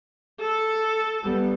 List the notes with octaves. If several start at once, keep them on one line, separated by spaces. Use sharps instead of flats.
A4
G3 B3